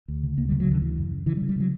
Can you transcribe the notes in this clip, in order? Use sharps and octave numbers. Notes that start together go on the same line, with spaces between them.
D2
C#3
D2 A#3
G3
C#3
F#3
D2 D3
C#3 E3
F#2
C#3
C#3 E3
G3
C#3
G3
C#3 F#3